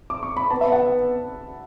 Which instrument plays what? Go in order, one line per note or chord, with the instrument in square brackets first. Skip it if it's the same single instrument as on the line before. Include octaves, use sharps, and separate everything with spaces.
[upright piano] D6
C#6
B5
[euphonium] B3 [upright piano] A5
[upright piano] E5
F#5